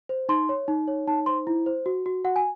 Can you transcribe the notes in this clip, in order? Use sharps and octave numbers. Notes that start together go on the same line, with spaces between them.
C5
D#4 C6
C#5
D#4
C#5
D#4 A5
C5 C6
E4
C5
F#4
F#4
F#4 F#5
G#5